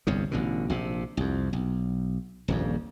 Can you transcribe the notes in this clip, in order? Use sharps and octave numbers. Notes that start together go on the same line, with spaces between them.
G1 C2 G2 C#3
A1 B2 D3
A#1 C3
C2 F2
B1
D#1 A#1 F2